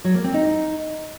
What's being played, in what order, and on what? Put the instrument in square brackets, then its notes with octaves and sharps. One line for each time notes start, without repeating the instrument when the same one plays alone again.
[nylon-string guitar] F#3
A#3
C4
D#4